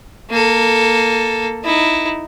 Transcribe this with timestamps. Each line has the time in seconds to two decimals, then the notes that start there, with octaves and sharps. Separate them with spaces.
0.30 A#3 A4
1.64 D#4 E4